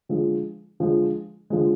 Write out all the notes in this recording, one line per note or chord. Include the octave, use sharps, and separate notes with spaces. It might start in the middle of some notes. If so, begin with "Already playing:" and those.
D3 F3 G#3
D3 F3 G#3
D3 F3 G#3